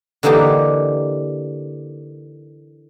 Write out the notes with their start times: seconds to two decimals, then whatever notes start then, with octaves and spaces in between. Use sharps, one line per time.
0.23 D3 E3 A#3 D#4 G4